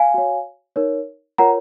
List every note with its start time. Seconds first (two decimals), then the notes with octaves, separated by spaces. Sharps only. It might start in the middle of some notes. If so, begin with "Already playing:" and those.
Already playing: F5 G#5
0.14 F#4 C#5
0.76 D#4 A#4 C#5
1.38 F4 A#4 C#5 F#5 A#5